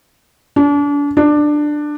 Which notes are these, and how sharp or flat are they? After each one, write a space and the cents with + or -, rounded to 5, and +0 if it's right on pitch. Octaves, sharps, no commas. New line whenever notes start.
D4 -35
D4 +15